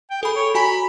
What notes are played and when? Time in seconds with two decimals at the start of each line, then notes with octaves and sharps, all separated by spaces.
0.11 G5
0.23 G#4 A4 B5
0.36 C#5
0.55 F#4 G#5 A#5 B5